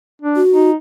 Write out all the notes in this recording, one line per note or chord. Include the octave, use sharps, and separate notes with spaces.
D4
F#4
D#4